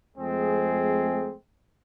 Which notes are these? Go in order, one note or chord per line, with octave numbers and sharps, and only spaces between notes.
F2 G#3 A3 C4 G#4